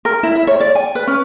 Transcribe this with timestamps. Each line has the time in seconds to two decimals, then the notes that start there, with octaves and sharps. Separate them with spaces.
0.05 A#4
0.23 E4
0.35 E5
0.47 C#5
0.60 D5
0.75 G#5
0.95 B4
1.07 C#4